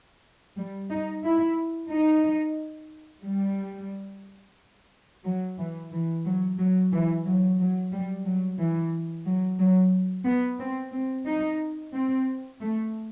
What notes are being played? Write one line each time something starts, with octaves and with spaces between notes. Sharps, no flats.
G3
D#4
E4
D#4
G3
F#3
E3
E3
F#3
F#3
E3
F#3
F#3
G3
F#3
E3
F#3
F#3
B3
C4
C4
D#4
C4
A3